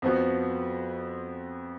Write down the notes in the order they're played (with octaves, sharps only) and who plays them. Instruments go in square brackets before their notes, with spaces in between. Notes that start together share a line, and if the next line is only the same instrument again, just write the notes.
[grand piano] F2 F3 B3 F#4